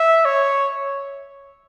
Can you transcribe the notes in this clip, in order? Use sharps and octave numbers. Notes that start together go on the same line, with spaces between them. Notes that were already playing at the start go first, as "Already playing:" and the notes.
Already playing: E5
C#5